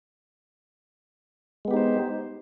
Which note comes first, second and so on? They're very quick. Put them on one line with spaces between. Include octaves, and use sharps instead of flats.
G#3 B3 G4 D#4 C5